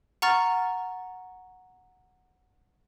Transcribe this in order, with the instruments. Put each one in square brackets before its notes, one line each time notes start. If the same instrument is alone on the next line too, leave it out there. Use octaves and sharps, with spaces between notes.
[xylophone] F#5 A#5 C#6 F6 A6